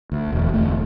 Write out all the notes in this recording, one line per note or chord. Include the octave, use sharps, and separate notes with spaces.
D2
E1
E1 A3